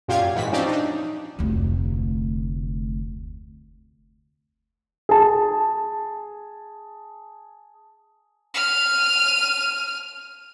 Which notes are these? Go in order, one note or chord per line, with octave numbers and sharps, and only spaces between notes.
F#2 A#2 F4 G4 F5 G#6
G#2 E3 F#4 B6
F3 C4 C#4 D#4 G4 D5
D4 D#4
F1 D2
G#4 A5
F6 D#7